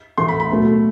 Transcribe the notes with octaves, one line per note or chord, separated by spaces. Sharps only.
A2 E3 A3 C6
B5
B5
B2 F#3 A3